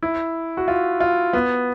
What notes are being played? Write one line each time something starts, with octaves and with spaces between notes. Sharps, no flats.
E4
F#4
F4
F4
B3